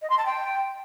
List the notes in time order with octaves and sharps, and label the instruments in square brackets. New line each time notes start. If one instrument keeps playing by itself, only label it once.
[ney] D#5
C6
A5
G5